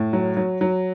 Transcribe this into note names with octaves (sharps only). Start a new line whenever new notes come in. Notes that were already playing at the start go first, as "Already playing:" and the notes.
Already playing: A2
F#3
F#3
F#3